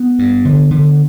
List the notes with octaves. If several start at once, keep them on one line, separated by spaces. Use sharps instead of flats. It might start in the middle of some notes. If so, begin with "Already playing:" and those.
Already playing: B3
G2
D3
D3